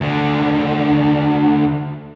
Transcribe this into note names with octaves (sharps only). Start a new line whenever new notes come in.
D2 D3